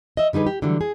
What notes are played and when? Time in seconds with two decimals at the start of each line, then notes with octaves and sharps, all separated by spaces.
0.17 D#5 E5
0.33 D3 G3 D#4 G#4 B4
0.47 G4
0.62 D3 E3 F#3 G3
0.81 G#4